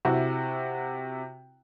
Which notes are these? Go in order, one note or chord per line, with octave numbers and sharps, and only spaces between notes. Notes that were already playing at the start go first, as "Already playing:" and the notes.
C3 E4 F#4